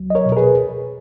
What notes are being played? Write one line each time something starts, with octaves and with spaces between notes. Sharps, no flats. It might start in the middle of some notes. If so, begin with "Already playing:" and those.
Already playing: C#2 F#3
D#5
A#4 C#5
B2
A#4
G#4 B4